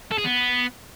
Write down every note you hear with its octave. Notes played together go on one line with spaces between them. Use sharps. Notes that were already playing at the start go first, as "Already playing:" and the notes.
A4
G#4
B3